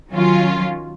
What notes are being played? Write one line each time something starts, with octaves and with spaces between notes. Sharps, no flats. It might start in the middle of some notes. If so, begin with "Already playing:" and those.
D#3 F#3 C#4 F4